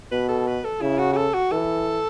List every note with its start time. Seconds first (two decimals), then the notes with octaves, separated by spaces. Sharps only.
0.12 B2 B4
0.29 A4
0.47 B4
0.64 A4
0.81 C#3 E4
0.99 F#4
1.13 F#4
1.17 A4
1.34 F#4
1.51 E3 A4